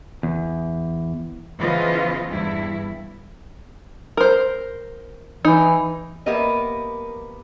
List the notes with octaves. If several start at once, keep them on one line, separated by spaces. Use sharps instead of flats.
E2
C#3 E3 F3 B3 F4 D#5
E2 G2 E4
A#4 C5
E3 D#4
A#3 B3 G4 A#4 D#5 E5